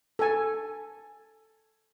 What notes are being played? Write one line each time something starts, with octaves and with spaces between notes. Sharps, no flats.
A4 G#5